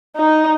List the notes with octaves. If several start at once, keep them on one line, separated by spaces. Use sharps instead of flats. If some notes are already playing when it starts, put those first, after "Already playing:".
D#4